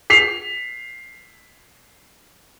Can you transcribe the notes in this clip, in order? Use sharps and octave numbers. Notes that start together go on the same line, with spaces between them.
B6 C7 F7